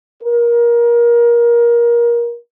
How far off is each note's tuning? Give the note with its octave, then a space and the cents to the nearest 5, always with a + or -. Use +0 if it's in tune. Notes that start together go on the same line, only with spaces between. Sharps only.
A#4 +25